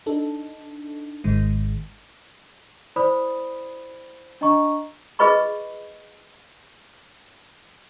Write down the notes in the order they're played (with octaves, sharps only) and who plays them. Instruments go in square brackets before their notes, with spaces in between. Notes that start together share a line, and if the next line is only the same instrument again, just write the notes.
[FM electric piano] D4 D#4 A4
G#1 G#2 D#3 G#3
[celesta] E4 C5 D5 B5 D#6
D4 D#5 A#5 C#6
[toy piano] F4 G#4 B4 D#5 B5 C#6